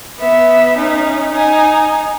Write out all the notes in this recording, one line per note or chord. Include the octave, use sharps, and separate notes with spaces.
B3 E5
C#4 D#4
D#4 G#5